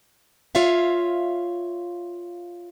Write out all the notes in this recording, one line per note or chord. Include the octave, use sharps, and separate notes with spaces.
F4 C#5 E5 F5